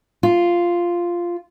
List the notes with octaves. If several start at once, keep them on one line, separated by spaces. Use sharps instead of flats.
F4